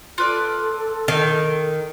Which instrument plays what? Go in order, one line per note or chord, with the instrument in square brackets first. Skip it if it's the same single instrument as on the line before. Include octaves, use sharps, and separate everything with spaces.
[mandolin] F4 B4 D5 [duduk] A4
[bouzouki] D#3